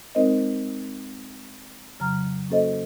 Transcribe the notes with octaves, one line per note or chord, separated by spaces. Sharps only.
G#3 C4 D#4 A#4 C5 D#5
F2 C#3 F#3 A#5 F6
A#3 C#4 F#4 A4 C5 D#5